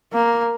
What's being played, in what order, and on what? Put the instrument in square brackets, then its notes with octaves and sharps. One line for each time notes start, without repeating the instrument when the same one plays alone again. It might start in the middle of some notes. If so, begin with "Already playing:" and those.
[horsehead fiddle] A#3